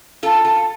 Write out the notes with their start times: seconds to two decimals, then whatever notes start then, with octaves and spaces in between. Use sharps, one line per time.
0.23 F4 A4
0.45 F4 A4